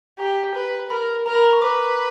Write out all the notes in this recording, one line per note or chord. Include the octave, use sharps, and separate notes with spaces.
G4 A#5
B4
A#4 B5
A#4 A#5
B5
A#5
C#6
B4 D6